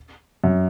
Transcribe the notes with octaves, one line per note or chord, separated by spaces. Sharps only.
F#2